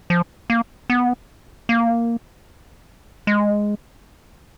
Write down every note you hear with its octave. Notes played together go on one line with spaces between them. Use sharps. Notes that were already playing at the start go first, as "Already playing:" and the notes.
F3
A#3
B3
A#3
G#3